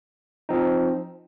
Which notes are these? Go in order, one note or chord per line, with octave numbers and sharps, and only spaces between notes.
F3 C4 D#4